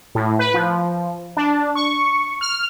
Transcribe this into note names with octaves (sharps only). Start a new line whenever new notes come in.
A2
B4
F3
D4
C#6
F6